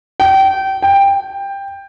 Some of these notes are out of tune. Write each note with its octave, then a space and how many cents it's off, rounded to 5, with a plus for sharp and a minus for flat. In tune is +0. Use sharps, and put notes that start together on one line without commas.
G5 -25
G5 +15